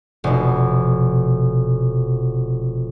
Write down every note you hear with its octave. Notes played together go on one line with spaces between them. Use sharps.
F1 B2